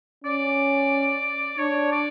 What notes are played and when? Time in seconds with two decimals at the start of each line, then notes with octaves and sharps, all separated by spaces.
0.24 C#4 D5
1.58 D4 C#5
1.92 D5